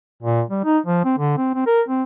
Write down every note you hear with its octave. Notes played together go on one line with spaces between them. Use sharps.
A#2
G3
D#4
F3
C4
D3
C4
C4
A#4
C4